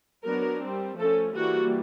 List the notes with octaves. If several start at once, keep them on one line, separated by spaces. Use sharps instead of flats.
F#3 B3 D4 A#4
G3 C4
F3 A3 C#4 A4
E3 G3 A#3 F#4